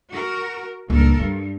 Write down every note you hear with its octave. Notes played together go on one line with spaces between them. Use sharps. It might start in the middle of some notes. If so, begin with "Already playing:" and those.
F#4 A#4
C#2 G2 A#2 A4 A#4
G2 G3